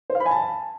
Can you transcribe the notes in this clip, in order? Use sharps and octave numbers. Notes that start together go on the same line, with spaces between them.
C5
F5
B5
G#5
A5